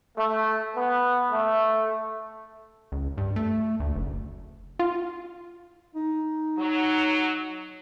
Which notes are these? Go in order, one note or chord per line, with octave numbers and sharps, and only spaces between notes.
A3
B3
A3
C#2
G2
A3
D2
F#1
F4
D#4
F#3